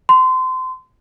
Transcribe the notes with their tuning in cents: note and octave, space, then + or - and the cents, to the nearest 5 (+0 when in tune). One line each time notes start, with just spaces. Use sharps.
C6 -25